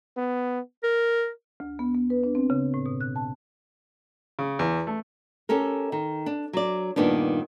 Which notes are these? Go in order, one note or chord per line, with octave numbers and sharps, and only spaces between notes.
B3
A#4
D2
B3
B3
B4
D4
C4
C#3
A2
B2
F#6
A5
C#3
E2
A3
C#4 G4 A4 A#4
D#3
D4
F#3 D5
G2 A#2 D#3 B3 D4